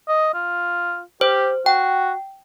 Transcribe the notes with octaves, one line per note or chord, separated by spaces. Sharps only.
D#5
F4
G4 C5
F#4 G5